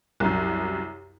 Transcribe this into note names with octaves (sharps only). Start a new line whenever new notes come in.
C2 F#2